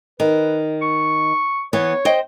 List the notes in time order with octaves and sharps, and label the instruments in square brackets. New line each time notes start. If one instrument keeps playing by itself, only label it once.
[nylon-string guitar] D#3 [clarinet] B4
[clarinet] C#6
[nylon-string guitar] E3 B3 [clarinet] C#5
[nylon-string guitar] C5 D#5 G5